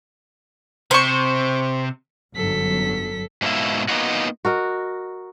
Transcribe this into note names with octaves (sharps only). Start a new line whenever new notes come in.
C3 C5 C#6
G1 F#2 F#3 A4 B6
G#2 B2 A#3 E5
A#3 B3 D#4 F4 F#4
F#4 A#4 D#5